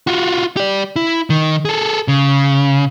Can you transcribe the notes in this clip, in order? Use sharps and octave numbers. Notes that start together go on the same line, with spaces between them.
F4 F#4
G4 D5
E4
D#3
G#4 A4
C#3